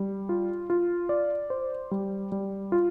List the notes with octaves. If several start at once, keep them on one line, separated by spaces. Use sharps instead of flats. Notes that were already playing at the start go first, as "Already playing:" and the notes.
Already playing: G3
F4
F4
D5
C5
G3
G3
F4